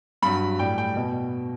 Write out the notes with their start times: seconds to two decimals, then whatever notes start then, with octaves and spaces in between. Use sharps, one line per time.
0.22 G2 F#3 B5
0.59 A2 G3 G5
0.78 G5
0.96 B2